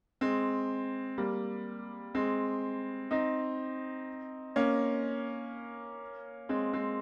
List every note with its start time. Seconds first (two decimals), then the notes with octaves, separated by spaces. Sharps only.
0.21 G#3 C4
1.18 G3 A#3
2.15 G#3 C4
3.11 C4 D#4
4.56 A#3 C#4
6.49 G#3 C4
6.73 G#3 C4